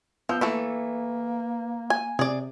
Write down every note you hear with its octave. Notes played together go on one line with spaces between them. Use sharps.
F3 B3 E6 G6
E3 A3 A#3 A4 B4
G#5
C3 G#4 D5